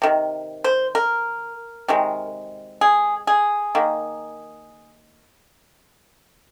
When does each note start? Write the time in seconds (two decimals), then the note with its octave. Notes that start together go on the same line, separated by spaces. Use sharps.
0.02 C3 D#3
0.64 C5
0.95 A#4
1.88 C3 D#3 G#3
2.81 G#4
3.27 G#4
3.75 D#3 A#3